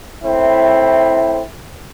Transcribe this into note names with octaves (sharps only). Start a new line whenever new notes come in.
A2 C4 E4